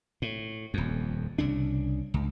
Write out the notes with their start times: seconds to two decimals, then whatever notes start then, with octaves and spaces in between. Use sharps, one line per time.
0.22 A2
0.74 D#1 F2
1.38 C2 C#3 D4
2.14 C#2